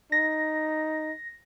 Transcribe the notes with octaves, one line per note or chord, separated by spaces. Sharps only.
D#4 A#6